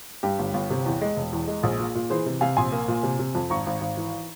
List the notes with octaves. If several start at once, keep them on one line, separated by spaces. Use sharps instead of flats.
G2 G4
G1
G1
C3
E2
G#3
E1
E2
G#3
A#1 G#4
A#2
A#2
E3 G#4 C5
C3
C3 F5 G#5
A#1 G#5 C6
A#3
A#2
C3
C3
F2
G#1 A#5 C#6
G#1
G#1
E3